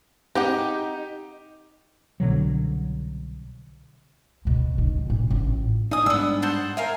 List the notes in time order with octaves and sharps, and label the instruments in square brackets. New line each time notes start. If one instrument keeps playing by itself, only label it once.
[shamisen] C4 G#4 F#5 [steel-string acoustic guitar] D#4 [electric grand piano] G4
[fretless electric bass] C2 B2 D3 F#3
[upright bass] D2 B2
C#2 D#3
A1 A#2
A1 F4
[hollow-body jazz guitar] D#4 D#5 [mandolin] G#5 D#6
[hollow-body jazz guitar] G#2 G3 D4 [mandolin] B3 E6
[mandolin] C5 F#5 A5
[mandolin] A#4 F5 G#5 [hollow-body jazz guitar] E5